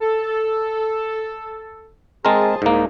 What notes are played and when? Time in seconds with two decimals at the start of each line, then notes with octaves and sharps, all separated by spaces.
0.01 A4
2.25 G#3 C4 G#4 A#4 C5 A5
2.62 C2 G#2 A#3 D#4